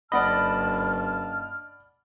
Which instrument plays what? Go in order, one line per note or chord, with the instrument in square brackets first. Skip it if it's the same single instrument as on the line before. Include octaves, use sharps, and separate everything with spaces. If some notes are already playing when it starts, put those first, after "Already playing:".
[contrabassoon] F#1 [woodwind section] G2 A5 F6 [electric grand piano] D5 F#5 B5 [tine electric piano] D#5